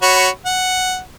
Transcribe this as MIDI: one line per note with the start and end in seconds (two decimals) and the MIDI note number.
0.02 0.29 66
0.02 0.29 73
0.02 0.29 83
0.46 1.00 78